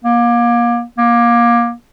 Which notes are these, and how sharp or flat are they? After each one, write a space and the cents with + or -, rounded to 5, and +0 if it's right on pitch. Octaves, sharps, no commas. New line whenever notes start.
A#3 +30
A#3 +25